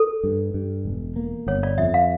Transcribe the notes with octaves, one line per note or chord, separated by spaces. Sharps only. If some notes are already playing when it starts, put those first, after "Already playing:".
Already playing: A4
G2
G2
E1
A#3
G1 C#5
D5
F2 E5
F5